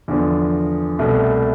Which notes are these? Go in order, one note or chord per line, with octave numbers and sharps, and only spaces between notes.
E2 D3 F3
C2 B2 A3